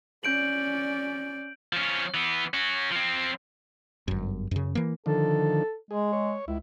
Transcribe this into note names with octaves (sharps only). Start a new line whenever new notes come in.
C#4 D5 G6 D7 F#7
F3 C#4
E3 B3
C#4 F#4
F3 C4
G1 F#2
F#2 C#3
E3 A#3
D3 D#3 F3 A4
G#3 G#4
C#5
C#2 E4